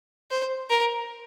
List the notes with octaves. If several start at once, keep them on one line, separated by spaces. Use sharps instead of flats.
C5
A#4